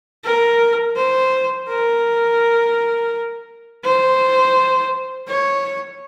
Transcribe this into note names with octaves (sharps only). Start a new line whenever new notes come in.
A#4
C5
A#4
C5
C#5